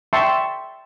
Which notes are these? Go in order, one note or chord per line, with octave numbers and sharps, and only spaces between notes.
E5 G5 A5 C6 C#6